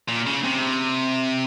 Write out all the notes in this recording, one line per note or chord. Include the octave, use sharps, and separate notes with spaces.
A#2
C#3
C3